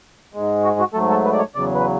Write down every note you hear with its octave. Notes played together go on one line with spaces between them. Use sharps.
G#2 G#3
F#4
F#4
G#2 F#3 A3 A4
A4
B4
D5
C#5
E2 C#3 F#3 D5
B4